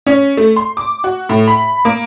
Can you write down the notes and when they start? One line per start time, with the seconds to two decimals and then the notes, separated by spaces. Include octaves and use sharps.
0.06 C#4
0.37 A3
0.56 C6
0.77 D6
1.04 F#4
1.29 A2
1.48 B5
1.85 A#3